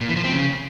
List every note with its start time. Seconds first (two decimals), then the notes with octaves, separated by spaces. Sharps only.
0.01 A#2
0.09 E3
0.16 F3
0.24 C4
0.32 C#3